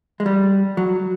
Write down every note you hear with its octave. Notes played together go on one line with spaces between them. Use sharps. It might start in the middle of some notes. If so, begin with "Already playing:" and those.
G#3
G3
F#3